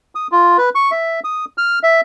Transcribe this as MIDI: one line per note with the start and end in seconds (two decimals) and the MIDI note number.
0.15 0.27 87
0.32 0.57 65
0.58 0.69 71
0.75 0.91 85
0.91 1.20 76
1.24 1.45 87
1.58 1.79 89
1.83 2.01 76